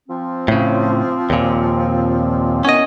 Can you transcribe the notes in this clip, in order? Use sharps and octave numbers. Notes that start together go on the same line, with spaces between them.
F3 C4
A2 C#3
D#2 A#2
D#3 E3 B3 C#4 D#5